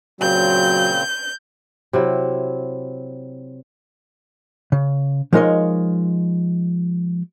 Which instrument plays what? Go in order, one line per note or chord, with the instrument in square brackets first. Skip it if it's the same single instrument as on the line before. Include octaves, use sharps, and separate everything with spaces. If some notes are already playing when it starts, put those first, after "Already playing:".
[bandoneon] A#2 C#3 C4 [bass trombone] F#3 [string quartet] G6
[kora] C3 F#3 E4
[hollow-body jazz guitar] C#3
F3 G#3 D#4 A#4 C#5 D#5